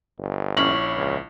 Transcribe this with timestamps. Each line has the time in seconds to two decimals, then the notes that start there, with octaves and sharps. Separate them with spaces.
0.18 G1
0.57 A#1 C#4 E4 F#7
0.97 C#2